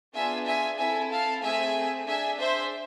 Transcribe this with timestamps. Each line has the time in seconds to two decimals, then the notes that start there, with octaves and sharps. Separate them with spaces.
0.14 B3 D4 F4 G#4 E5 G#5
0.46 E5 G#5
0.78 C4 E4 A4 E5 G#5
1.11 F5 A5
1.42 A3 C4 G#4 E5 G#5
2.07 D4 G#4 E5 G#5
2.38 C5 E5